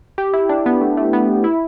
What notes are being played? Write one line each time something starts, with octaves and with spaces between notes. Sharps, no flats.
G4
E4
D4
B3
A3
A3
B3
E4